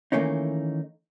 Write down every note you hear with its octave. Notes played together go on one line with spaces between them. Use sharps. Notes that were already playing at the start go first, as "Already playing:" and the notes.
D#3 E3 A3 A#3 C#4 D#4